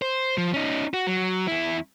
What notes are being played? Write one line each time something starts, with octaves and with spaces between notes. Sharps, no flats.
C5
F3
C#4 D#4
F#4
F#3
E2 E4